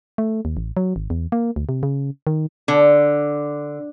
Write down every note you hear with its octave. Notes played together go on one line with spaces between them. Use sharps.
A3
D#2
A1
F#3
G#1
E2
A#3
D2
C3
C#3
D#3
D3